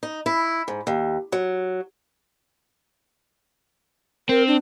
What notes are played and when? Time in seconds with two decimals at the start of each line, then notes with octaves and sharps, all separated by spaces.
0.03 D#4
0.26 E4
0.68 G#2
0.87 D#2
1.32 F#3
4.29 C4 A#4
4.47 D4